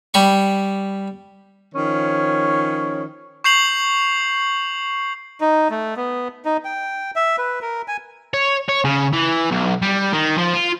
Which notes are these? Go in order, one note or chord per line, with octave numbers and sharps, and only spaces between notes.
G3 B5 C#6
D#3 F3 C#4 C#5
C#6 G6 C7 F7 F#7
D#4
A3
B3
D#4
G5
E5
B4
A#4
G#5
C#5
C#5
C#3
E3
B1
G3
D#3
F3
F4